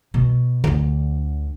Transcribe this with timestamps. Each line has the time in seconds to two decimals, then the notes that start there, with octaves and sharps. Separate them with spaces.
0.14 B2
0.64 D2 D3